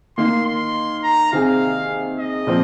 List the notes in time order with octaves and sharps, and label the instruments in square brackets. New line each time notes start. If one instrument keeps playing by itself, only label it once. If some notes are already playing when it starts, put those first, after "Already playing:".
[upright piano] D#3 A#3 D#4 [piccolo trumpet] C6
[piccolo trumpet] C6
A#5
[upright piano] C3 D#3 C4 G#4 [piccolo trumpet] F5
[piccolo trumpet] D#5
[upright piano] A#2 F3 C4